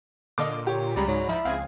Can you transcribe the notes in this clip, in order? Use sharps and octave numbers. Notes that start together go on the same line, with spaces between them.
A#2 D3 A4 D#5 F5 D6
G4 C#5
C#2 G3 G#3 D5 A#5 B5
G#2 F#3
F3 E4
C#2 C4 G#4 F5 G#6